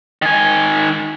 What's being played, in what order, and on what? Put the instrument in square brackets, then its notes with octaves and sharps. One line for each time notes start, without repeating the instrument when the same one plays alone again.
[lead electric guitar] D#3 G#5